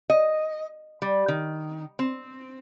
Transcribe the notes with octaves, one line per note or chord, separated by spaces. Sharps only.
D#5
G3
D#3
C4